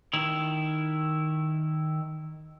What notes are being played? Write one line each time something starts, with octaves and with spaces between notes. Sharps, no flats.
D#3 E4